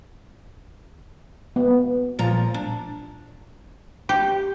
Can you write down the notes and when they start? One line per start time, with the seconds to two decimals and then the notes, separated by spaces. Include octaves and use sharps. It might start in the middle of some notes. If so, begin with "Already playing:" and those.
1.56 B3
2.19 A#2 F3 A#5
2.54 D4
4.09 G4